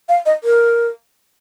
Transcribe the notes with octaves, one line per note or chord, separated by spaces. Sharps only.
F5
D#5
A#4